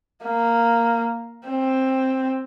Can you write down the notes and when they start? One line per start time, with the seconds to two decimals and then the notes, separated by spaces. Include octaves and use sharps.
0.23 A#3
1.47 C4